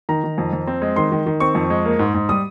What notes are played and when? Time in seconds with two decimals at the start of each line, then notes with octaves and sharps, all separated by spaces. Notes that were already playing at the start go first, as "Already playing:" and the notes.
0.09 D#3 A#5
0.24 D#3
0.38 F2
0.52 F2
0.67 C4
0.82 G#3
0.96 D#3 C6
1.12 D#3
1.26 D#3
1.40 C4 C#6
1.55 F2
1.70 G#3
1.85 A#3
1.99 G#2
2.14 G#2
2.29 G3 D#6